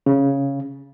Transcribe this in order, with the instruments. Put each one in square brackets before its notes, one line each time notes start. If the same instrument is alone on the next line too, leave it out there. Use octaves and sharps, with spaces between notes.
[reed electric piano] C#3